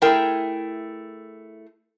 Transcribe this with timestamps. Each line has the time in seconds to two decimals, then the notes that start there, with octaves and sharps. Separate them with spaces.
0.02 A3 E4 G#4 A#4 G5